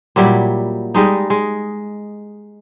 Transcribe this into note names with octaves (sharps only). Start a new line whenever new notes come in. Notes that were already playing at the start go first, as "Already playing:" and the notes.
A#2 F#3 G3 E4
G3 G#3 D#4
G#3